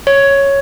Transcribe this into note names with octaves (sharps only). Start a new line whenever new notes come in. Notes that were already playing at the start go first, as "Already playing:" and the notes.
C#5